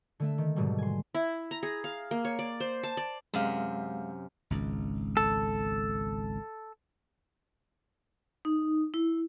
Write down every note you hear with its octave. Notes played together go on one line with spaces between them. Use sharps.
D3 A3 E5
D#3
G#2 B2 D3 F#3 G3 A3
G#5 C6
E4
A#5
G#4
F5
A#3
C#5
D5
C5
A5
D5
F#2 C3 G#3 F5
G#1 C#2
A4
D#4
E4